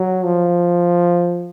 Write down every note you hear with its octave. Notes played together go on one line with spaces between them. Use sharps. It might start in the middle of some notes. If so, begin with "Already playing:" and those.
Already playing: F#3
F3